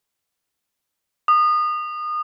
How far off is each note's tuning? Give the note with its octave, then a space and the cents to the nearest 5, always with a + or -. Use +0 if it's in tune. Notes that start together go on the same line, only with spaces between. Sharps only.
D#6 -30